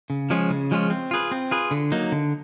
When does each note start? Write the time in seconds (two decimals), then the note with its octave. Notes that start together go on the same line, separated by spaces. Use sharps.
0.10 C#3
0.30 F3 G#3 C#4 F4
0.50 C#3
0.71 F3 G#3 C#4 F4
0.90 C4
1.11 F4 G#4 B4
1.31 C4
1.51 F4 G#4 B4
1.71 D3
1.92 F#3 A#3 D#4
2.12 D3